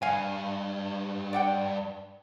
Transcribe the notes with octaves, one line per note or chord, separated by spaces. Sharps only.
G2 F5 G#5
D5 F#5 G5